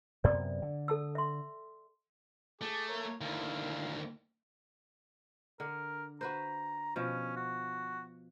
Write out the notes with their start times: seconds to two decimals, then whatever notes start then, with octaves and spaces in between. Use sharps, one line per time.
0.24 F#2 C3 B3 D5
0.62 D3
0.88 A4 A5 E6
1.15 E5 C6
2.61 A3 G#4 D6
2.89 A#3 A#4 C#5
3.21 D2 D#3 E4 F5
5.60 D3 A#4
6.21 F#4 B4 C5 A#5
6.96 B2 F3 C#4
7.36 F#4